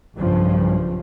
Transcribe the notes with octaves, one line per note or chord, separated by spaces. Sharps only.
B1 G2 C#3 F3